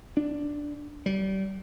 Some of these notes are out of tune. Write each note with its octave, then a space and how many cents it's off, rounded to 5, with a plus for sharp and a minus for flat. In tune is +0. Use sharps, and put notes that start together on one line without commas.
D4 +0
G3 -30